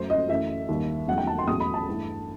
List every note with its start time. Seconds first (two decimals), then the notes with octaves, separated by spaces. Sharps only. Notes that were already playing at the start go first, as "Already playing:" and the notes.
Already playing: F#2 F#3 A3 C5
0.10 D#5
0.28 F#2 E3 A3 E5
0.68 D#2 D#3 G3
1.08 E2 D#3 F#3 A3 F#5
1.18 G5
1.27 A5
1.38 C6
1.47 E2 B2 F#3 A3 D#6
1.60 B5
1.74 A5
1.88 G2 E3 A3